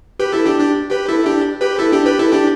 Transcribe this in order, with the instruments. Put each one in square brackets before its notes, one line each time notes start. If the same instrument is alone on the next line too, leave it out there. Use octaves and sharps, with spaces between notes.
[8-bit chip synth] G4 B4
E4 A4
D4 G4
D4 G4
G4 B4
E4 A4
D4 G4
G4 B4
E4 A4
D4 G4
G4 B4
E4 A4
D4 G4